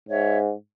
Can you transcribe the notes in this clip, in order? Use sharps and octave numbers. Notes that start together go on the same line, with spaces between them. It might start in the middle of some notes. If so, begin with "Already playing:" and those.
G#2 C#5 E5